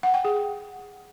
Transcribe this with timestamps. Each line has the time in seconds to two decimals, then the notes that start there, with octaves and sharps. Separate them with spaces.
0.03 F#5
0.14 G5
0.25 G#4